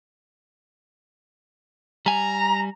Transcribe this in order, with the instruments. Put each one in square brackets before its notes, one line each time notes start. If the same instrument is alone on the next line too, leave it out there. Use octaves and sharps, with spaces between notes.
[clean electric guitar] G3 G#5 [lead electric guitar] A#5